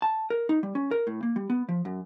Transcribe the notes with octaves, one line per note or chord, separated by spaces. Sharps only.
A5
A#4
D#4
G3
C#4
A#4
A2
A#3
G3
B3
F3
F#2